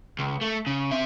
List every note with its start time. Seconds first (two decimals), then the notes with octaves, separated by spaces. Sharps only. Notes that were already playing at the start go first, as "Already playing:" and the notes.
0.19 C#2
0.41 A3
0.67 C#3
0.91 C4 E5